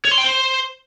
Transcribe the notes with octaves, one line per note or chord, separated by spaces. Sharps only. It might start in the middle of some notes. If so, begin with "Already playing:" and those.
C#5
C6
G5
C5